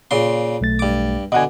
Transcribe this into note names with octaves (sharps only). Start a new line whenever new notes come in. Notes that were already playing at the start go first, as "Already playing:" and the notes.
A#2 C#3 C6
B1 A3 A6
G2 D6
B2 D3 D#5 F#5 G#5